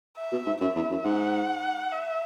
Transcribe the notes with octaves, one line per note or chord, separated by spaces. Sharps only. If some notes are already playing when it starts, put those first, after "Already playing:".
E5
B2
G#2
F#2 E5
E2
F#2
G#2 F#5
E5